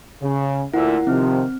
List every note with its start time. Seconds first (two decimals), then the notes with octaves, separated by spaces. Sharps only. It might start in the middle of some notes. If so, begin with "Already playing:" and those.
0.21 C#3
0.74 D2 A#2 E4 A#4 E5 F#5
1.07 C3 D#3 F3 C4 F6